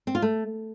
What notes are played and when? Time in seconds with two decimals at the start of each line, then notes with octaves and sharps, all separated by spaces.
0.07 C4
0.15 F4
0.22 A3